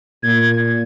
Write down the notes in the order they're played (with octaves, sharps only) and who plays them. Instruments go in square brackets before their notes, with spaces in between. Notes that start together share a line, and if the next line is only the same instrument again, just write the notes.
[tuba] A#2 [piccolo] G#6